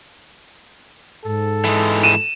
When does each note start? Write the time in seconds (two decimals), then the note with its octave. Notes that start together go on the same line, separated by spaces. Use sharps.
1.24 G#2 A4
1.65 E3 G#3
2.03 D#7 E7